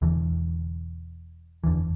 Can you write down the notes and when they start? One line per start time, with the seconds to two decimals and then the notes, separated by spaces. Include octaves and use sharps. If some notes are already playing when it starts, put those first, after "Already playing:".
0.02 E1 E2 D3 E3
1.64 F#1 E2 D3 E3